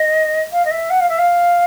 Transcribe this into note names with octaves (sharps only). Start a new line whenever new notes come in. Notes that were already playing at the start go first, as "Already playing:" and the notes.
Already playing: D#5
F5
D#5
E5
F#5
F5
E5
F5